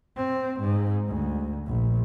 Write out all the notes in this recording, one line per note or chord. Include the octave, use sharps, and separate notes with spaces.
C4
G#2
D2
A#1